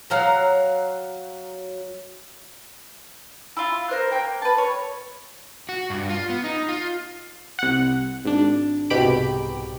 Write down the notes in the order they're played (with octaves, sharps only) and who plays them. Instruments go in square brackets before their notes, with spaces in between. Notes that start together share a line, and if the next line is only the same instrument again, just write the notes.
[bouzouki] F#3 F5 F#5 A#5
[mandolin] E4 F4
A#4 C5 F6 F#6
A#3 G5
B4 A5
C#5
[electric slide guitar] F#4
G2
F4
B3
D#4
F4
[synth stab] C2 F#5
G#1 D4
C2 G#2 B2 G4 B5 D7